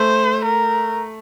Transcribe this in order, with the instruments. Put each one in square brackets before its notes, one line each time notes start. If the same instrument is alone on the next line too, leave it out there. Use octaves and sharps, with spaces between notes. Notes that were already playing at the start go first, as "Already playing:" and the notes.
Already playing: [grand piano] A3 [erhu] C5
[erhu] A#4